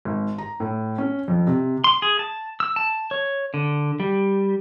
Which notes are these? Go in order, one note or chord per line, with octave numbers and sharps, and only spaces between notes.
G#1
A#5
A2
C#4
F2
C3
C6
G#4
A5
E6
A5
C#5
D3
G3